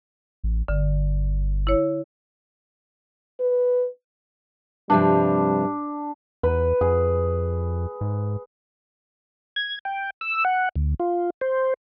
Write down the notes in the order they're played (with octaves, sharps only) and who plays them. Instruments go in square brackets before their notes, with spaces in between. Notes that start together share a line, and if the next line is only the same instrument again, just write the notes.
[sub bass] A1
[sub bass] G1 [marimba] D3
[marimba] E4 C#5
[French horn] B4
[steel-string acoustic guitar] G2 C3 F3 [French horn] G3 [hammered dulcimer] D4
[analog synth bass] E2 [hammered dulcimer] B4
[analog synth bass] F2 [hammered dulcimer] G#4
[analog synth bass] G#2
[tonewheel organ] G#6
G5
E6
F#5
D2
F4
C5